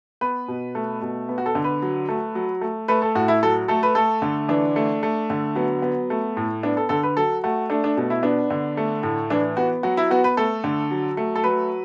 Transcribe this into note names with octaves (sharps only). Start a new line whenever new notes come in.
B3 B4
B2
A3
B2
B3
F#4
A4
D3
B4
F#3
A3
F#3
A3
A3 B4
A4
A2 F#4
E4
F#3 A4
A3 A4
B4
A3 A4
D3
E3 D4
A3
A3
D3
F#3 B3
B3
A3
A2
B3 D4
A4
D3 A4
B4
F#3 A4
A3 F#4
A3 D4
D4
B2
E4
B3 D4
D3
A3
A2
E3 D4
B3 F#4
F#3 F#4
E4
B3 F#4
B4
A3 A4
D3
F#3
A3
A4
F#3 B4